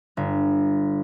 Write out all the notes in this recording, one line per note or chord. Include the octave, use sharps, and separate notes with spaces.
G1